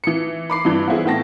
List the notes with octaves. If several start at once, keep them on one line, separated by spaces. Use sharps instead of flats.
E3 C#7
B5 D6 C7
G2 E3
B3 C4 E4 G#4
A2 B3 G5 A5 A#6